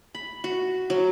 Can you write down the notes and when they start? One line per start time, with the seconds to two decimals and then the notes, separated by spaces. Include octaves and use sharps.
0.15 B5
0.44 F#4
0.90 F#3